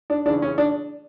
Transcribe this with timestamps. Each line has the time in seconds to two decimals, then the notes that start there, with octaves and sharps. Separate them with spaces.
0.10 D4
0.25 C#3 D4
0.29 E3
0.42 C#4
0.58 D4